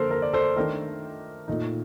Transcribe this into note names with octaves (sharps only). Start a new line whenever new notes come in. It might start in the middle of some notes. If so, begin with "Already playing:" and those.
Already playing: D3 F3 A#3 A4 A#4 C5
A#4
D5
A4 C5
D#3 A3 D4 A#4
A#2 A3 D#4